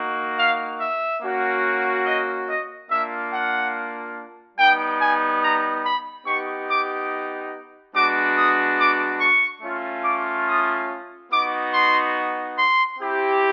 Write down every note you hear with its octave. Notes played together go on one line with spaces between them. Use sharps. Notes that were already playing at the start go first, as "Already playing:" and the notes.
Already playing: A#3 D#4 F#4
F5
E5
A#3 C#4 F#4
D#5
D#5
A#3 D4 F4 E5
F#5
G3 B3 D#4 G5
G#5
A#5
B5
B3 D#4 G4 C#6
D6
G#3 B3 D4 F#4 D6
D#6
D6
C#6
A3 C#4 F4
D6
D#6
B3 D#4 F#4 D6
C6
C6
C4 E4 G4